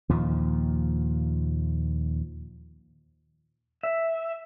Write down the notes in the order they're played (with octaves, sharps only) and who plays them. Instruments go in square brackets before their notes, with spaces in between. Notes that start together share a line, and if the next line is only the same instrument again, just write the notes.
[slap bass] D#2 A#2 F3
[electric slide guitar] E5